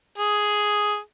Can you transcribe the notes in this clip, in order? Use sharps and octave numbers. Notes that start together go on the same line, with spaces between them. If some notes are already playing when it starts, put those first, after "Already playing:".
G#4